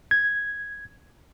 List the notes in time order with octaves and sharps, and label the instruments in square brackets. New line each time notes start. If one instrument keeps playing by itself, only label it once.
[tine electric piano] G#6